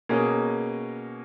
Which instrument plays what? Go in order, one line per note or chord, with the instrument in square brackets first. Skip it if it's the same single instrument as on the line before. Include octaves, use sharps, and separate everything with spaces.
[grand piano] B2 A#3 C#4 G#4